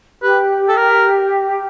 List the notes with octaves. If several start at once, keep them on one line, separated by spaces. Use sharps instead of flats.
G4 B4
A4
A#4